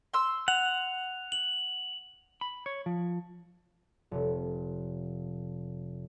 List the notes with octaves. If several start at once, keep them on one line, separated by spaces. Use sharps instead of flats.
C6 E6
F#5 F7
F#7
B5
C#5
F3
F1 C3